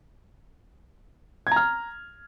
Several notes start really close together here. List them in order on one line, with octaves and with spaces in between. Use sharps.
G#6 A#5 F6